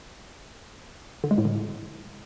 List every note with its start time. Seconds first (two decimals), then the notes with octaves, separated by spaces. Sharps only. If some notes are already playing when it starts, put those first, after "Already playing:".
1.24 D3
1.31 G#3
1.38 A2
1.45 D3